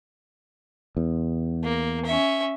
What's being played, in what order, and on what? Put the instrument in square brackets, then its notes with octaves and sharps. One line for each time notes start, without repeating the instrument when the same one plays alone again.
[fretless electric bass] E2
[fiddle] A#3
C#4 E5